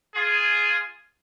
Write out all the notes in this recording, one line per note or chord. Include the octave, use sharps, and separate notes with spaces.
F4 G#4